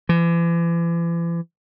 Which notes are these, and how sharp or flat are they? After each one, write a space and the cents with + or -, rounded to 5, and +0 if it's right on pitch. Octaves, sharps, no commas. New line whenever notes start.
E3 +40